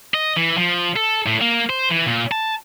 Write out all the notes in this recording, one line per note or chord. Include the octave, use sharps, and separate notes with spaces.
D#5
E3
F3
A4
A2
A#3
C5
E3
A#2
A5